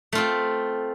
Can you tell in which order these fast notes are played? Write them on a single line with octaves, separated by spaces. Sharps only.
A3 F4 C4